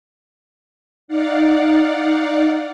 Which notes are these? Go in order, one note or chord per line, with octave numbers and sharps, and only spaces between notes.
D#4 D5 F5 F#5